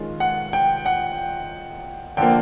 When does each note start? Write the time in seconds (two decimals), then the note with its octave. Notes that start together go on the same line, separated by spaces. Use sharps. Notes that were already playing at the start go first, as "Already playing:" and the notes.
Already playing: D#3 G#3 C#4 F4
0.20 F#5
0.53 G5
0.86 F#5
2.17 D3 F3 A#3 G5